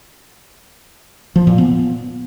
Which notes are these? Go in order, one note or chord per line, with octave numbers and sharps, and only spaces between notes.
F3
A#2
B3